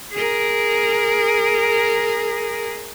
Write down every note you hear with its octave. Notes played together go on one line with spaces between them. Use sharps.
G#4 A#4